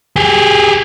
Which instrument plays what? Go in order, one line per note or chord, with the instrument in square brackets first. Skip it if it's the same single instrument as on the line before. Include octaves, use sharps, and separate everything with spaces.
[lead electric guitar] G4 G#4